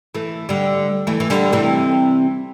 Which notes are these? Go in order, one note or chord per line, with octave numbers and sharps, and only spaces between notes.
E3 A3
D3 G3
E3 A3
E3
D3 G3
C3 E3